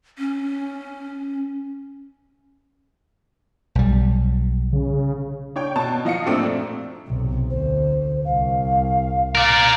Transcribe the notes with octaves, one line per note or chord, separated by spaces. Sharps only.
C#4
B1 G3
C#3
D4 C#5 G5
B2 A5
F3 D#5 F5 C#7
F#2 A#2 A3 C4 D4
B1 C3
D2 C5
C2 F5
A#4 D5